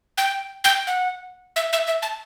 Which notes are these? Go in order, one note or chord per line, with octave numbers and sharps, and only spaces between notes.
G5
G5
F#5
E5
E5
E5
A5